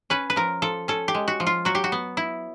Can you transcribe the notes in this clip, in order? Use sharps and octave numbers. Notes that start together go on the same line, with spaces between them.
C#4 B4
B4
F3 A#4
F3 A4
C#4 A4
G4
G#3
F#4
F3
F4
F#3 F#4
G4
F#4
B3
E4